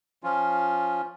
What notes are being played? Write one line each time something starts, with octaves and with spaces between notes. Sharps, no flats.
F3 C#4 F4